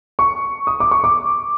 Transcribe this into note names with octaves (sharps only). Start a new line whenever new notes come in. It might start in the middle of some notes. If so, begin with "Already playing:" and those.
C#6
D#6
D6
C#6
D6